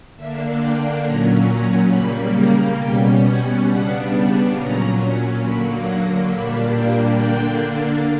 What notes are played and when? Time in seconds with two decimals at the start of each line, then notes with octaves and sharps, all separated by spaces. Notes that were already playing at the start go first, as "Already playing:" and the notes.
0.15 D3 A#3 D4 E5
0.59 G5
1.02 A#2 F#3 C#4 A#5
1.47 A#5
1.90 C#3 G3 A#3 B5
2.34 A#5
2.77 B2 G3 C#4 G5
3.22 F#5
3.65 C#3 G3 B3 D4 F#5
4.52 A#2 F#3 C#4 A#5
5.39 D3 F#3 A#3 B5
5.83 A#5
6.27 A#2 G3 A#3 D4 B5
6.71 G5
7.14 D3 A#3 D4 G5